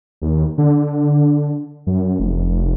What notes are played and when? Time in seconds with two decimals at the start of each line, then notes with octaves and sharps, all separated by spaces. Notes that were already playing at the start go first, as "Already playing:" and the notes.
0.22 D#2
0.58 D3
1.87 F#2
2.19 F1